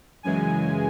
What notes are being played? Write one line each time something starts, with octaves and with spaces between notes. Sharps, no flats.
F#2 C#3 E3 G#3 G#5